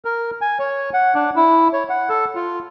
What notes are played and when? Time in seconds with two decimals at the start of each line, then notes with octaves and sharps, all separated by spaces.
0.05 A#4
0.41 G#5
0.59 C#5
0.94 F#5
1.15 D4
1.36 E4
1.73 C#5
1.90 F#5
2.09 A4
2.35 F4